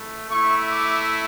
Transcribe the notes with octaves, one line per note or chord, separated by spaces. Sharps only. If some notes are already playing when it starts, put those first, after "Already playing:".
Already playing: A3 E4
A3 E4 C#6
D6